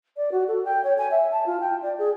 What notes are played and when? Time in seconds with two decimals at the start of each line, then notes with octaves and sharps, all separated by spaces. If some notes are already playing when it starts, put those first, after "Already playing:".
0.17 D5
0.32 F#4
0.48 A4
0.65 G5
0.84 C#5
0.98 G#5
1.11 E5
1.31 A5
1.46 F4
1.60 G5
1.82 D5
1.98 G#4